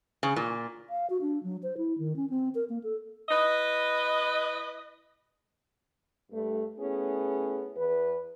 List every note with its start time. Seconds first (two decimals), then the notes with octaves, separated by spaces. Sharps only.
0.23 C#3
0.36 A#2
0.90 F5
1.10 F#4
1.21 D4
1.43 F#3
1.63 C5
1.77 E4
1.98 D#3
2.16 C#4
2.30 C4
2.55 A#4
2.69 A#3
2.84 A4
3.29 E4 B4 D#5
6.32 G2 A3
6.79 A3 B3 C#4 E4 G#4
7.77 E2 B4